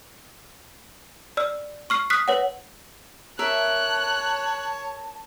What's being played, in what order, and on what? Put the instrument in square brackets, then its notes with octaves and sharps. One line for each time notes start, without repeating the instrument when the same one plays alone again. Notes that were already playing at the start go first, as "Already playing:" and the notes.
[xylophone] D5 E6 F6
C#6 F6 C7
D#6 F6 F#6 B6 C7
B4 C#5 F#5
[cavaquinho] A#4 E5 [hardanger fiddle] C#5 [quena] A5 [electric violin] F#6